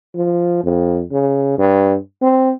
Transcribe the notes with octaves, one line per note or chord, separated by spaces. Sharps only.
F3
F2
C#3
G2
C4